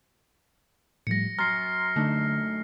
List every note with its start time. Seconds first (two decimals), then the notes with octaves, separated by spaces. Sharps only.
1.07 A2 F3 G3 A#6 C#7
1.39 F#2 A#5 C6 F6 A6 C7
1.96 D3 A3 D4 D#4